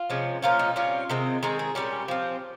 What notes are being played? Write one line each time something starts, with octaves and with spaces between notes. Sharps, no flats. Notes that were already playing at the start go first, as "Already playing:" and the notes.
Already playing: F4
C3 F3 G#3 C#4
A#2 F3 A#3 C#4 F4
D#4
C3 G3 C#4 F4
C3 D#3 G#3 C4
D#3 G#3 C4 G#4
G#4
A#2 G3 C#4 G4
F3 C4